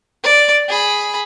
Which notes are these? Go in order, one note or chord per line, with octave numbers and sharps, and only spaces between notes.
D5
G#4 B5